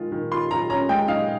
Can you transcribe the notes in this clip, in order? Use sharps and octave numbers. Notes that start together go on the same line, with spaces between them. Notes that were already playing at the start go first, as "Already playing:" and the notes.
Already playing: D#3 G#3 F4
D#3
F4 C6
F4 A#5
C#4 A#5
G#3 G5
D#4 F5